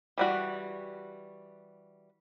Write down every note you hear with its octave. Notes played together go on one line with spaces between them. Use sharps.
E3 G3 F#4